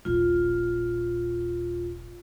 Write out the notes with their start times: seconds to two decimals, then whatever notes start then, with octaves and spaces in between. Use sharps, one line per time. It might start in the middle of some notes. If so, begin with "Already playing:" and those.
0.05 D#1 A#1 F4